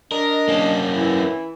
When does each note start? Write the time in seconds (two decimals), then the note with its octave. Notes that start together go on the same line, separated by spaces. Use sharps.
0.12 D4 A#4 D#5
0.48 A#3 C#4
0.95 E3 E4